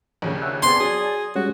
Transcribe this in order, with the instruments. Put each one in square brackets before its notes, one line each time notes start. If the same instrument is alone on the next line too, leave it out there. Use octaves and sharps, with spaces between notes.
[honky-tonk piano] A#1 D#2 C#3
[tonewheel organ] E5 F#5
[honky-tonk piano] B3 C4 G#4 [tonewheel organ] D5 G#5 A5 [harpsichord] C6
[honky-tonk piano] F#3 [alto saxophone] G#4
[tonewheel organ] G3 G#3 C#4 [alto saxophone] F#4